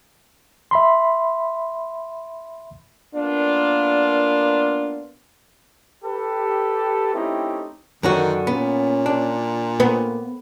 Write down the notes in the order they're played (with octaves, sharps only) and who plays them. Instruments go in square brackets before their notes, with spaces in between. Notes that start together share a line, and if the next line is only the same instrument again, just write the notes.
[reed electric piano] E5 B5 C6
[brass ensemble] A#3 B3 D4 F4
[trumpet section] G4 A4 B4
A3 C4 C#4 D#4 E4 G4
[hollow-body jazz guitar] F#2 D3 F#4 [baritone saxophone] D#3
[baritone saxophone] A#2 [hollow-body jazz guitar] B3 [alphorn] C#4
[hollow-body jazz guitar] D4
[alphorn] A#3 [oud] B3